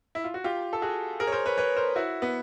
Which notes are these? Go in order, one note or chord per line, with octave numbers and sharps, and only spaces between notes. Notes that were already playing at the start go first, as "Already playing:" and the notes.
E4
F4
F#4
F4 G4
A4
F#4 G#4
G#4 A#4
C#5
A#4 C5
B4 C#5
B4 C#5
A#4 C5
E4 F#4
B3